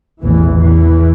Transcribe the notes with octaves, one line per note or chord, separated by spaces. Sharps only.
A1 E2 A2 E3
E2 E3